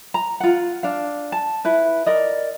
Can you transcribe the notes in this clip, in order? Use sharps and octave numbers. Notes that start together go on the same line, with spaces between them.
A#5
F4 F#5
D4 F5
A5
E4 B4
A#4 D5 D#5